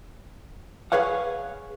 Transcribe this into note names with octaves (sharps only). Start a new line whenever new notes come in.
G#4 B4 C#5 F5 F#5